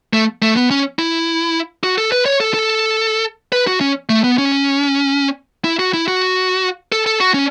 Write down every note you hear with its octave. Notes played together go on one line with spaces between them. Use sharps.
A3
A3
B3
C#4
E4
F#4
A4
B4
C#5
A4
A4
B4
F#4
C#4
A3
B3
C#4
E4
F#4
E4
F#4
A4
A4
F#4
C#4